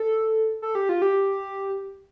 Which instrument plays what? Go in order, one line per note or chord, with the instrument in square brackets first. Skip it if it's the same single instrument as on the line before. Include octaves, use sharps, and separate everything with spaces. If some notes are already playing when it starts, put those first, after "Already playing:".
Already playing: [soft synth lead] A4
A4
G4
F4
G4